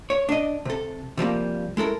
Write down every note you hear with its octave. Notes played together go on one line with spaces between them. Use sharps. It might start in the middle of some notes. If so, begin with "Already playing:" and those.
C#5
D4 D#5
C3 A4
C3 F3 G3 A#3
G#3 E4 A4 A#4